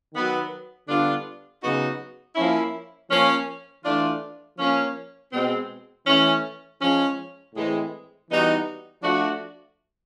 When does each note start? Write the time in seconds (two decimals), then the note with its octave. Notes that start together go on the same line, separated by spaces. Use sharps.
0.13 D#3 F#3 B3
0.87 D3 G3 B3 D4 F4
1.61 C#3 F#3 B3 D#4 F#4
2.36 F3 A#3 C#4 E4
3.09 F3 A#3 C#4
3.83 E3 A3 D4 F4
4.58 F3 A#3 C#4
5.32 B2 G#3 C4
6.06 E3 A3 C#4
6.80 F3 G#3 C#4
7.54 A2 E3 G#3 C4
8.29 E3 G3 B3 D#4 F#4
9.02 F3 A3 D4 F#4